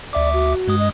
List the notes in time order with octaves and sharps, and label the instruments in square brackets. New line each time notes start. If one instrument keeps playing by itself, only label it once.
[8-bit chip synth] D2 E5 D6 [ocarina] D5
[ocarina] F#4
[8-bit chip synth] G2 G#3 D#6
[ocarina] D#5